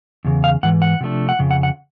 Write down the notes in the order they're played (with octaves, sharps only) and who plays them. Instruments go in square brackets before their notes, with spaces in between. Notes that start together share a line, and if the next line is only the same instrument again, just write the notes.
[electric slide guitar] E2 C#3
F5
G#2 E3 F#5
F#5
C3 F3 A3 D4
F#5
F2 C#3
F#5
F#5